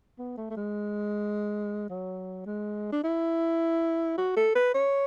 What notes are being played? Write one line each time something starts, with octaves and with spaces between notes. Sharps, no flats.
B3
A3
A3
G#3
F#3
G#3
D4
E4
F#4
A4
B4
C#5